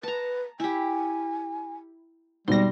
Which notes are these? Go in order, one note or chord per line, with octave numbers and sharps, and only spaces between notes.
B4 A5 A#5
E4 G4 G#5
G#2 B2 G3 C4 C6 A#6